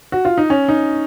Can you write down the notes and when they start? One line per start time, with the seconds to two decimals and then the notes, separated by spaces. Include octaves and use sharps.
0.12 F#4
0.25 F4
0.38 D#4
0.50 C#4
0.69 D#4